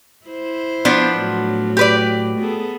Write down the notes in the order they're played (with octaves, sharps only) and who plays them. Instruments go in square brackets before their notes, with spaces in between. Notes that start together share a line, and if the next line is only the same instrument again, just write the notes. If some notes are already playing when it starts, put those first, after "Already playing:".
[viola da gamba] E4 C5
[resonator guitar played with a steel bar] F3 B3 D4
[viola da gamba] A2 F#3
[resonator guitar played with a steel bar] G4 B4 D5
[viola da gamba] B3 G#4 A4